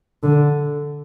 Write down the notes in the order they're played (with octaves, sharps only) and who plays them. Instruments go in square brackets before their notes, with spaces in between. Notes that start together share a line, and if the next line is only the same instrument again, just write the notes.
[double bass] D3